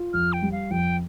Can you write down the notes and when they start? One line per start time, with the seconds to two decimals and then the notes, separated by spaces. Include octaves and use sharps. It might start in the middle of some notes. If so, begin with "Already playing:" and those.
Already playing: F4
0.13 F2 F6
0.33 G5
0.42 G3
0.52 F5
0.70 F2 G5